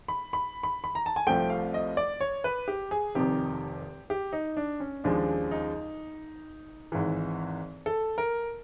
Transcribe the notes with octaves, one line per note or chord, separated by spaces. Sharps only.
B5
B5
B5
B5
A#5
A5
G#5
C2 C3 F3 A3 G5
F5
D#5
D5
C#5
B4
G4
G#4
F1 F2 C3 D#3 G4
G4
D#4
D4
C#4
D#2 C#3 F3 G#3 D4
D#4
G#1 G#2 E3
A4
A#4